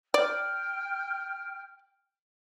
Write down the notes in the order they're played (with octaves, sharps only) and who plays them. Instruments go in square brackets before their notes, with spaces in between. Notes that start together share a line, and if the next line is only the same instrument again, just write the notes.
[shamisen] D5 [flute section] G5 F6